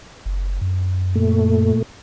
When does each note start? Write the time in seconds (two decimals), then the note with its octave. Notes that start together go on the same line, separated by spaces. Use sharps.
0.26 F#1
0.61 F#2
1.15 A#2 A3